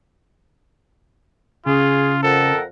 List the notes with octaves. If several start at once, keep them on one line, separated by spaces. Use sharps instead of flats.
C#3 F4 G#4
F2 A4 A#4 F#5